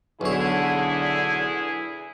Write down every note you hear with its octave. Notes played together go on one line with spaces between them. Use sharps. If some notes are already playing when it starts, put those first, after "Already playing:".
B1 E2 D3 E4 G#4 C#5